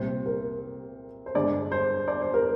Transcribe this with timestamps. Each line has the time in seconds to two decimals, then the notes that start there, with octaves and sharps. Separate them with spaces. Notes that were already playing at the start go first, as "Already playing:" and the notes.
Already playing: C2 A#2 G3 C5
0.26 A#4
1.26 C5
1.34 G2 D3 G#3 D4 D5
1.72 C5
2.08 D5
2.21 C5
2.34 A#4